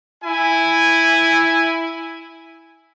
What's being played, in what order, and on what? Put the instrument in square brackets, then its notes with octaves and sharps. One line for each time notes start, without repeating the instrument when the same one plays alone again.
[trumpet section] E4 G#5